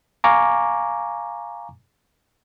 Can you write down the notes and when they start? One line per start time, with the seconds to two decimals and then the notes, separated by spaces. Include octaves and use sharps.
0.24 F5 G#5 A#5 C#6 D6